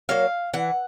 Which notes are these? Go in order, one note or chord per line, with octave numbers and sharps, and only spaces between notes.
F#3 A#3 F5
E3 F#5